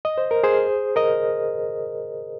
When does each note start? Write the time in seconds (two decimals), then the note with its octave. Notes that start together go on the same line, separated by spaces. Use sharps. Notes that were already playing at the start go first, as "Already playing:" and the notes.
0.05 D#5
0.18 C5
0.31 A#4
0.44 G#4 C5
0.96 A#4 D#5